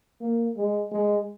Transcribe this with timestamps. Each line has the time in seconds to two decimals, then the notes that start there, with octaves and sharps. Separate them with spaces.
0.21 A#3
0.57 G#3
0.91 G#3